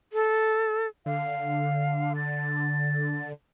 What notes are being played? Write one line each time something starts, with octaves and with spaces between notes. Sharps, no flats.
A4
D3 F5
A6